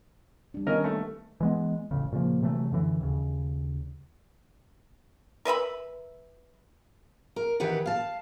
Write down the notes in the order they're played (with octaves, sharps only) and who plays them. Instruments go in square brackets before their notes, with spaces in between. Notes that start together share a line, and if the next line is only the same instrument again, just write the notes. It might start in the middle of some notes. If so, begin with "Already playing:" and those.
[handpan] G3 D4
[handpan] D#3 B3 [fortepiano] C#4 A#4 D#5
[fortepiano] A3
[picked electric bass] E3 G#3 B3
E1 A1 C#3
A#2 C#3 F3 A#3
C3 E3 F#3 A3
F#2 D3 E3
D#2 C#3
[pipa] A#4 B4 E5 B5
[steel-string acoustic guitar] A#4
D#3 E3 G4 B4 F#5
F5 A5